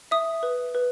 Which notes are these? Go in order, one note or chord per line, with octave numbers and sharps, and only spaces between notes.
E5 D#6
B4
B4